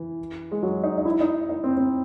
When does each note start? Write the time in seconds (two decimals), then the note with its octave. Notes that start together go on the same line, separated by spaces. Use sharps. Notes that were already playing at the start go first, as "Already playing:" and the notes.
Already playing: E3
0.52 G#3
0.63 F#3
0.84 D#4
0.98 D#4
1.05 E4
1.20 D#4
1.49 D#4
1.64 C4
1.77 C4